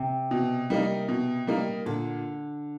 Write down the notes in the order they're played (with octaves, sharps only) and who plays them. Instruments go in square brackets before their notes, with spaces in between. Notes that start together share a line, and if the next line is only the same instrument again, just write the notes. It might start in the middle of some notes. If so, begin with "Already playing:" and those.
Already playing: [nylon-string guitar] C3
[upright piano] B2
G3 A#3 D#4
B2
G3 A#3 D#4
[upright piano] A#2 [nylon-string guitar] D3